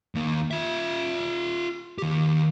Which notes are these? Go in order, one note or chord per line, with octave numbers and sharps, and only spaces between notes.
D#2 A#3
F4 E5
D#3 G4